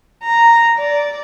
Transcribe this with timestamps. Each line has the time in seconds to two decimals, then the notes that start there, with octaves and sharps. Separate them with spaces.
0.23 A#5
0.79 D5